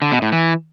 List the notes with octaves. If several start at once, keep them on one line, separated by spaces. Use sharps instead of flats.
D3
B2
A2
E3